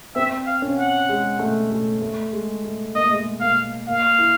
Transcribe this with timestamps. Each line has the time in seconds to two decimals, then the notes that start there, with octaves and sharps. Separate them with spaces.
0.15 C4 E5
0.46 F5
0.62 C#4
0.77 F#5
1.09 G#3
1.39 A3
1.71 A3
2.01 A3
2.33 G#3
2.64 A3
2.95 A#3 D#5
3.03 A3
3.11 G#3
3.18 A3
3.41 A#3 F5
3.88 A#3 F5
4.19 E4